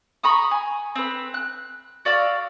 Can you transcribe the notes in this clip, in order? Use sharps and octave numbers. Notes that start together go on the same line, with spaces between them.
A#5 B5 C#6 D#6
G#5
C4 B4
F#6
F#4 D5 F5 E6